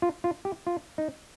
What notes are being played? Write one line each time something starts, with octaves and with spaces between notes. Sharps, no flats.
F4
F4
G4
F4
D#4